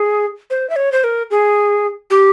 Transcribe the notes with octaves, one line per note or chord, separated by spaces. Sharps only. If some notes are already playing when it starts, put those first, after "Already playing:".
Already playing: G#4
C5
E5
C#5
C5
A#4
G#4
G4